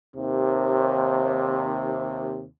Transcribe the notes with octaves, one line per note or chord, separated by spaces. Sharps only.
D#2 C3